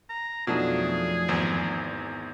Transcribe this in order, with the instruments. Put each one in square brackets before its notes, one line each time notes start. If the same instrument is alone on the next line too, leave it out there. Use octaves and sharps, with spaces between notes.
[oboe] A#5
[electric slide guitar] F2 A3 D4 [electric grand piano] B2 [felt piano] F3 F#3 D#4 [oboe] G#4
[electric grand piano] G#1 E2